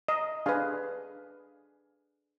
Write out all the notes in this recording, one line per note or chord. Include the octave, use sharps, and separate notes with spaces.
D#5
D4 G#4 B4 F5 G#5